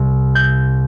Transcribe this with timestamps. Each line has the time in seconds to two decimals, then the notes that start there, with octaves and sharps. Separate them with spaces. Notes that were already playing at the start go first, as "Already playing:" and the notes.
Already playing: C2 C3
0.35 G6